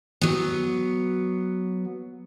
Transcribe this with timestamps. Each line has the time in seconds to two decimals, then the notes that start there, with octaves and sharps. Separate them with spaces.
0.21 F#3 B3